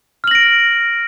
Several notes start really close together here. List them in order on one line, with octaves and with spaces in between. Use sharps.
F6 F#7 A#6 D7